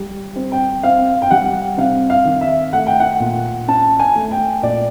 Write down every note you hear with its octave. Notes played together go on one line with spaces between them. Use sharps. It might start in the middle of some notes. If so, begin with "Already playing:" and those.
Already playing: G3
C4
G5
C4 F5
G5
G3 F#5
C3 F5
F5
D#3
E5
A3 F#5
G5
F#5
A#2
C#4 A5
G#5
A3
G5
A#2 D5